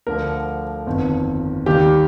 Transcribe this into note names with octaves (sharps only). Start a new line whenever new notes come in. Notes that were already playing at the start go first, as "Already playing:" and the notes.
D2 D3 F3 A#4
G1 F2 D#3
D#2 D#3 G3 G4